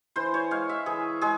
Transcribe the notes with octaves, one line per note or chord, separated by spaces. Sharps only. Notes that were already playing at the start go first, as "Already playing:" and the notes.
E3 C5
C#5
G#3 F5
E5
E3 G#4
G#3 G#4